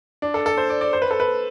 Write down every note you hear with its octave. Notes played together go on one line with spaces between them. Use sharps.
D4
A4
A4
C5
D5
D5
C5
B4
A4
B4